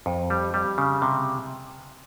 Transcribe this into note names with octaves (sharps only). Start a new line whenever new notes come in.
F2
G3
G3
C#3
C3